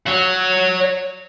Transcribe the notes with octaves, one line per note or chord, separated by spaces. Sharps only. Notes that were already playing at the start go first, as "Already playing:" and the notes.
C#5 F#5